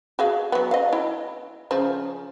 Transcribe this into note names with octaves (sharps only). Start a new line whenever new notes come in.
F#4 G#4 F5
F#3 B3
D#5 F5
E4
C#3 F3